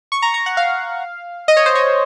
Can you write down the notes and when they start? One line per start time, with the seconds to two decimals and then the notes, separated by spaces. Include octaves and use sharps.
0.12 C#6
0.22 A#5
0.34 A#5
0.46 F#5
0.57 F5
1.48 D#5
1.57 C#5
1.66 C5
1.75 C#5